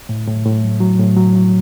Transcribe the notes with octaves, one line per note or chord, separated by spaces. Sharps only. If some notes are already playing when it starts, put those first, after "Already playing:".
A2
A2
A2
F#3
F#3
A2
F#3
F#3